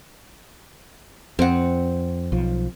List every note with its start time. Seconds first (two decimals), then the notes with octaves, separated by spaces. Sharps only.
1.39 F2 C4 F#5
2.32 B1 F3